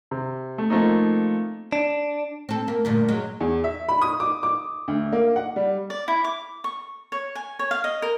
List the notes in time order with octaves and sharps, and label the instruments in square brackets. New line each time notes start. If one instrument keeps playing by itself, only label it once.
[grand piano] C3
A3
F3 A3 A#3 C4 D#4
[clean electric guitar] D4
[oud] C4 A4
A#3
D2 G2 A#2
F#3 G#3
[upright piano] E2
E5
B5
D#6
D6
D6
D2
A#3
F#5
G3
[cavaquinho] D5
E4
D6
C#6
C#5
G#5
C#5
F5
D#5
A#4